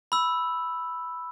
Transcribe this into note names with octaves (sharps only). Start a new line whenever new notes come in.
B5 E6